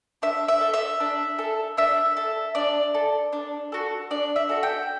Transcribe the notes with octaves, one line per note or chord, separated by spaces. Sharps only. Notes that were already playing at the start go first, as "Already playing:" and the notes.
D4 E5
E5
A4
E5
D4
A4
D4 E5
A4
D4 D5
A4
D4
F#4 A4
D4 D5
E5
F#4 A4
G5